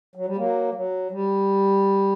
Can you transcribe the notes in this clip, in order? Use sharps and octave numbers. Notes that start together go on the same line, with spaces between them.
F#3
G3
F#3 A#3
F#3
G3